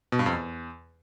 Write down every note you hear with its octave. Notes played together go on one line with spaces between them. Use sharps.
B2
G2
F2
E2